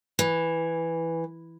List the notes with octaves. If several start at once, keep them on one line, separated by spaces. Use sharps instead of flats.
E3